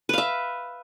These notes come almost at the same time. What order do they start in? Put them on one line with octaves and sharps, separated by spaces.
B4 F5 E5